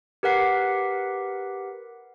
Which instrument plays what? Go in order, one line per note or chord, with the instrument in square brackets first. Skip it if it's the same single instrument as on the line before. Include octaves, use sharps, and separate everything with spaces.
[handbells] G4 A#4 B4 F#5 B6 C7